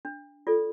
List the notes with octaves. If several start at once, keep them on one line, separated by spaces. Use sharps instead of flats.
D4
F4 A4 D5